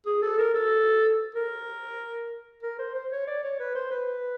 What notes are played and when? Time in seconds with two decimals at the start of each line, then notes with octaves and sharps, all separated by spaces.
0.06 G#4
0.22 A4
0.38 A#4
0.55 A4
1.35 A#4
2.63 A#4
2.79 C5
2.95 C5
3.12 C#5
3.27 D5
3.43 C#5
3.59 B4
3.75 C5
3.91 B4